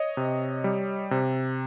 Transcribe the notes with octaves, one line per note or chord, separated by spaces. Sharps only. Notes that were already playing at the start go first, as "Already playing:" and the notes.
Already playing: C#5 D#5
C3
G3
C3